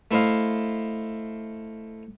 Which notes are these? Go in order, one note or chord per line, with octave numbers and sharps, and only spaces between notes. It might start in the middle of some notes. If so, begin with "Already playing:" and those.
A3 E4 C5 D#5 F5